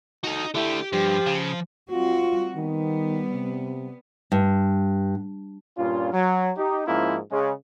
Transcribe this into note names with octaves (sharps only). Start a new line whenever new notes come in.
D#4 F#4 A4
D3 A3 E4 G4
G2 F3 G4 C5
C#3
G3 C4 F4 F#4
D#3 G3 B3
C3
G2
G2 A#2 C#4 F4
F#3
D#4 G4
G#2 F3 A#3 C#4 E4 F4
C#3 G#3